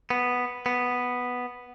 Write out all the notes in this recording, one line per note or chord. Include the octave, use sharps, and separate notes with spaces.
B3
B3